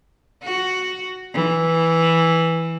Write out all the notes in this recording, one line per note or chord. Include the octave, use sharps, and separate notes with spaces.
F#4
E3